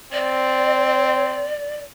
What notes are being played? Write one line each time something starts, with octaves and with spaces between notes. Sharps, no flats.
C4 D5